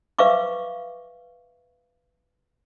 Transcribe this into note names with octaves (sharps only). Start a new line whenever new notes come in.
B4 E5 F5 C#6 D6